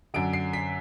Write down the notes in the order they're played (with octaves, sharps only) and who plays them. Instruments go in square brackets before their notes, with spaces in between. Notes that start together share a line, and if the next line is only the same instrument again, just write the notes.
[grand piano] F#2 D3 D7
C7
B6